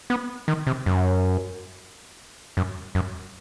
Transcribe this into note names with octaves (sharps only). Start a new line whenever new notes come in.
B3
D#3
C3
F#2
F#2
F#2